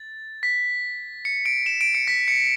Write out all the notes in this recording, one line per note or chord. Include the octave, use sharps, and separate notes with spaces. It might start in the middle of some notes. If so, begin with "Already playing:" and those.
Already playing: A6
B6
C#7
D7
E7
D7
C#7
B6
C#7